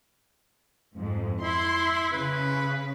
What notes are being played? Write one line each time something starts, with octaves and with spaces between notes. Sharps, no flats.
F2 G#2
E4 C6
C#3 B4